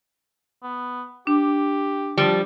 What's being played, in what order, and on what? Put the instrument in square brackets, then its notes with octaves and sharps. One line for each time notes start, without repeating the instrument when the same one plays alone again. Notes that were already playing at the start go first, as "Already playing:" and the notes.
[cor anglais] B3
[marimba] D4 [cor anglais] G4
[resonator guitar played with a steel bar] F3 G3